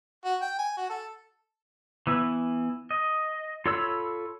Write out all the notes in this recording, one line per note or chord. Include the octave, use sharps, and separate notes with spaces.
F#4
G5
G#5
F#4
A4
E3 B3 E4
D#5
F4 A4 C#5 B5 E6